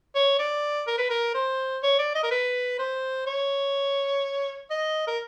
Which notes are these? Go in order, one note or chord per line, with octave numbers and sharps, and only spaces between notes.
C#5
D5
A#4
B4
A#4
C5
C#5
D5
D#5
A#4
B4
C5
C#5
D#5
A#4